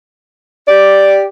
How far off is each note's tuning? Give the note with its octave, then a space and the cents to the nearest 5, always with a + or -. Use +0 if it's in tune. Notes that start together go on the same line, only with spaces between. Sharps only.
G4 +0 D5 +0